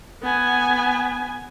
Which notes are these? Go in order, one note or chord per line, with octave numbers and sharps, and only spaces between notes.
B3 G#5